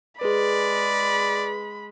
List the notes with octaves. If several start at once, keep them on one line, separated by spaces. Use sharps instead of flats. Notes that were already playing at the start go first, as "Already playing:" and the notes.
G#3 G#4 B4 D5 B5